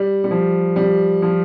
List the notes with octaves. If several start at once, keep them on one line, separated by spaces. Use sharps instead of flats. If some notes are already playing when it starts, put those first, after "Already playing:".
Already playing: G3
G3
F3
G3
F3